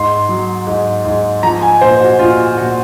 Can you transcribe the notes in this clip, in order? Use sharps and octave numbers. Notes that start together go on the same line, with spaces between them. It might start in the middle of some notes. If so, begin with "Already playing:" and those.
Already playing: G#2 C6
F#3
G#2
G#2
F3 A#5
G#5
A#2 C5
F#4
A#2 F4
A#2 F#4